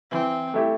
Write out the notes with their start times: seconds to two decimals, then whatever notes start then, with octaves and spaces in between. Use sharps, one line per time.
0.11 E3 C4
0.54 A3 E4 G4